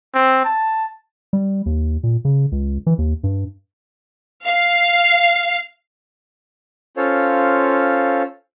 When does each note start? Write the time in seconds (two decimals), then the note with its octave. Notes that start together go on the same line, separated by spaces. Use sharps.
0.14 C4
0.45 A5
1.33 G3
1.66 D#2
2.03 A#2
2.25 C#3
2.52 C#2
2.87 E3
2.98 D#2
3.23 G2
4.45 F5
6.97 C#4 F4 A4 C5 C#5 F5